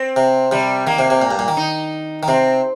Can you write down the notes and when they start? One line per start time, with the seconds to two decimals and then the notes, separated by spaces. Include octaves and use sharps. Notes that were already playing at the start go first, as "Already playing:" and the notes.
Already playing: C4
0.16 C3
0.51 C3 G3
0.87 D#3 A#3
0.99 C3
1.10 C3
1.22 A#2
1.31 G2
1.39 A#2
1.48 D#3
1.57 D#4
2.23 D#3
2.28 C3 C4